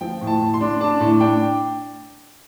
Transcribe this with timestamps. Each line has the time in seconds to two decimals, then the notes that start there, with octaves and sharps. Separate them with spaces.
0.01 F3 G5
0.21 A2
0.27 A5
0.41 A2
0.54 C6
0.61 D4
0.80 D4 A5
1.00 A2
1.20 D4 G5